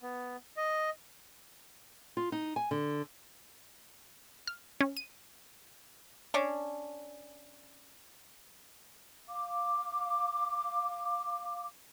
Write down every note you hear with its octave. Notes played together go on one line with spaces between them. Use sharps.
B3
D#5
F4
D#4
G#5
D3
F6
C#4
D#7
C#4 D4
F5 D6